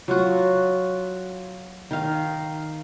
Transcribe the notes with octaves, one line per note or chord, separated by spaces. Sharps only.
F#3 F4 F#4
D#3 D#4 F5